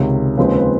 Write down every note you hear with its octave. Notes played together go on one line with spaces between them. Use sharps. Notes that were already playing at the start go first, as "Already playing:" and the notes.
Already playing: C#2 C3 D#3 C#5
D#2 C#3 F3 G#3 C4 B4
B4